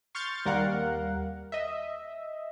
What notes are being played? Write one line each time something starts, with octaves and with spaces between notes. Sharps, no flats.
C6 C#6 F6 G6 A6
D#2 G3 A#4 F5 F#5
D#5 E5